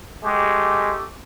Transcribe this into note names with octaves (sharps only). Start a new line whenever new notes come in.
G#3 A3 G4